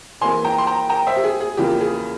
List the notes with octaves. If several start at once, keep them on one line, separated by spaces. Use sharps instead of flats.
E2 E3 A#3 G#5 C6
G5 A#5
C6
G5 A#5
G5 A#5
C5 E5
G4
G#4
G#4
E2 C#3 F3 A#3 G4
G#4